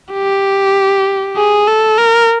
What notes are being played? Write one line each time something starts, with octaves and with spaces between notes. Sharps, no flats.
G4
G#4
A4
A#4